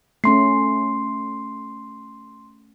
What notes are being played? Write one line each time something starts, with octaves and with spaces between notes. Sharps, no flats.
A3 C#4 C6 C7